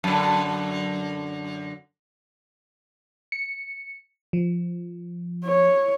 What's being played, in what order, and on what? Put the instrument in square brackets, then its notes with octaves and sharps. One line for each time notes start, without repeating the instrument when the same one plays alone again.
[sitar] F#2 D3
[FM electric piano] C#7
F3
[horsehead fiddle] C#5